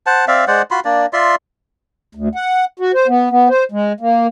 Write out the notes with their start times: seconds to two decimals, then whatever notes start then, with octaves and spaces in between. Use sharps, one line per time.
0.06 C5 F#5 A5
0.28 C4 D5 E5 F5
0.48 G#3 C5 D5 F#5
0.71 F4 F#4 B5 C6
0.85 A#3 D4 D5
1.13 F4 D5 E5 C6
2.15 D2
2.35 F#5
2.79 F#4
2.94 C5
3.08 B3
3.30 B3
3.49 C5
3.72 G#3
4.00 A#3